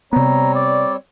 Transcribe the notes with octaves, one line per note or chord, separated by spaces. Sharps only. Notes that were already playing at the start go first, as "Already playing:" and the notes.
C3 G3 B3 C4 C#5 A#5
D5